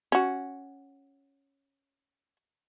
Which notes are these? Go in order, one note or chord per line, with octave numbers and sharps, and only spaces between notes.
C#4 F#4